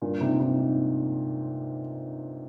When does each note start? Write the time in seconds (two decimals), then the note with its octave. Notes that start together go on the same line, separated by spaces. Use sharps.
0.02 G2 A#2
0.21 G#2 C3
0.40 G#2 C3
0.59 G#2